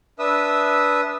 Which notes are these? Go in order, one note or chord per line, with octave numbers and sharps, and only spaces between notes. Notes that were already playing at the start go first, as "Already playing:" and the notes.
D4 B4 E5 D#6 E6